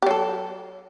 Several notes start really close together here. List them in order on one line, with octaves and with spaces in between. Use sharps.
G4 F#3 A4